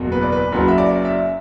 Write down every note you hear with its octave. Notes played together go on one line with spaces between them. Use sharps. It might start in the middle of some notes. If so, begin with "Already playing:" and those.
Already playing: F#1 E2 B2 F#3
B4
D5
B4
F#1 F#2 F#3 B4
E5
D5
E5